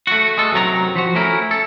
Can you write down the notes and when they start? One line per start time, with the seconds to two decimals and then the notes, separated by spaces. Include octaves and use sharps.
0.07 A3 F#4
0.37 G#3 A4
0.52 F#2 C3 D#3 F#3 A#4 A#5
0.96 F3 F#4
1.15 A3 C#4 E4 A#4
1.51 A4